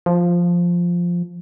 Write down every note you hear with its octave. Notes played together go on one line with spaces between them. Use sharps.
F3